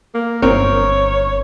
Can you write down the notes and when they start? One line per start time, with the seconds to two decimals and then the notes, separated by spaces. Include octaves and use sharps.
0.14 A#3
0.42 G1 C4 A#4 C#5